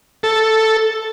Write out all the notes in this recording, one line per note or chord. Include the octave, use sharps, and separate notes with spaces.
A4